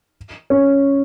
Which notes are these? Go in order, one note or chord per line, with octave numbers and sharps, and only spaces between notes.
C#4